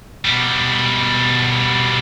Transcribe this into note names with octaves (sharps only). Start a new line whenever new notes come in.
B2 G3